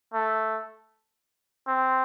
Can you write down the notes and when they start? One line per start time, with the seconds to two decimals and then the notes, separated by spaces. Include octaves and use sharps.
0.14 A3
1.67 C4